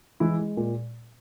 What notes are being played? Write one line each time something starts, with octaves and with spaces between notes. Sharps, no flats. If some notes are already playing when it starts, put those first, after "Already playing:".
E3 G#3 E4
G#3
A#2